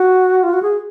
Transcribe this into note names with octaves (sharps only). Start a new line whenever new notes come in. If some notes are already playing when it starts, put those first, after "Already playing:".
Already playing: F#4
F4
F#4
G#4